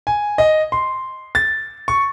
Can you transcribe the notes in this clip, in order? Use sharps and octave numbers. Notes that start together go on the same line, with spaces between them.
G#5
D#5
C6
A6
C#6